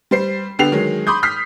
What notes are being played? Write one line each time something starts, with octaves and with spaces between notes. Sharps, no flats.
G3 C5 C7
D3 B3 D4 G4 C7 F7
D#3 F#3 G#3
B5 C6 D6 D#6 G6
D#6 F6 B6 C7